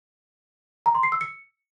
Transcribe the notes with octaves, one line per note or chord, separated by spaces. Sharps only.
A#5
C6
C7
E6
C#7